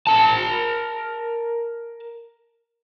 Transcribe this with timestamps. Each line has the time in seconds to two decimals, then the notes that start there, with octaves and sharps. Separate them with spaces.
0.07 A#4 A5